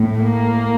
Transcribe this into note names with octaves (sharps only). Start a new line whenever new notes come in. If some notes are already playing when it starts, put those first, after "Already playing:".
Already playing: A2
A#3